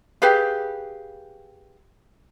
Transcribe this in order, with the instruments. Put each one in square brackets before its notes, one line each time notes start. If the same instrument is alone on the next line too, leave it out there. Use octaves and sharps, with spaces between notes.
[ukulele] G4 G#4 B4 F5